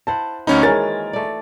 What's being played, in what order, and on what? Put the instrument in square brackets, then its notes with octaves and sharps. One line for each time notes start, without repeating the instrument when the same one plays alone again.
[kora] E4 C5 F#5 [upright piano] A5
[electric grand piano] D2 C#4 D#4 [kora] A#3 F#4 C5 [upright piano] B5
[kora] D#3 E3 G#3 [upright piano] A#4 C#5 G#5 [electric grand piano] A6
[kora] A3 D5